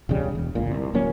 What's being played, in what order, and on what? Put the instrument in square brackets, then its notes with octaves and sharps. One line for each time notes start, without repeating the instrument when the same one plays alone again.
[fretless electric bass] E1 C#2 C#3 G3
E1
G1 C#2 A#2
C2
D1 F#3 A#3 C#4